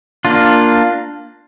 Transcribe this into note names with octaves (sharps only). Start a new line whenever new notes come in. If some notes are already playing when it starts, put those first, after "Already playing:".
A#3 D4 F4